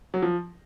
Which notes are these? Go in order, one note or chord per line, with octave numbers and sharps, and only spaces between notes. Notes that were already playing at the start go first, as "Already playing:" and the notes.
F#3
F3